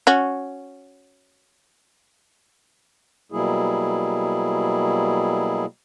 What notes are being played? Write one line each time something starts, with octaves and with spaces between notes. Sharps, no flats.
C#4 F#4
B2 F#3 G3 A#3 E4 G#4